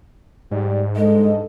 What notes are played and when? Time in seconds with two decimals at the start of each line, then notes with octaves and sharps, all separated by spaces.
0.51 G#2 G3 G4 D5
0.96 G2 G#3 A4 D#5